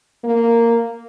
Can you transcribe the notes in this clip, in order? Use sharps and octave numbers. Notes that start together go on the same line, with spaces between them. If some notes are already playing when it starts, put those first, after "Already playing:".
A#3